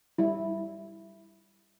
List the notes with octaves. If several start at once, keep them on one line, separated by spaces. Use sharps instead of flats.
G3 E4